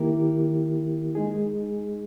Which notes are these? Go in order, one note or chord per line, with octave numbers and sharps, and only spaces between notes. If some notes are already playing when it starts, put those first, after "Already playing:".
Already playing: D#3 A#3 E4 G4 A#4
G#3 D#4 G#4